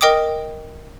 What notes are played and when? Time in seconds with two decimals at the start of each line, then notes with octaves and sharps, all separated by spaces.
0.01 A#4 D#5 G5 D6 D#6